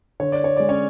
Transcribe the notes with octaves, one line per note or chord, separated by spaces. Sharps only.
D3 C#5
D5
C#5
G#3 D5
C#4 C#5